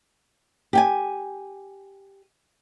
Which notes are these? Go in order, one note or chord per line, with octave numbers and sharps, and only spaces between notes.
G4 G5 G#5